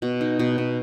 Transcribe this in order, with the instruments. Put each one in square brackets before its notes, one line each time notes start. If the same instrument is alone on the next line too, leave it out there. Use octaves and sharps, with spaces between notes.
[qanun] B2
D#4
B2
B2